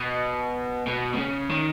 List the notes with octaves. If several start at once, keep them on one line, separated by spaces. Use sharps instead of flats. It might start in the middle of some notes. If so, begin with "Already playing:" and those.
Already playing: B2
B2
B2
C#3
D#3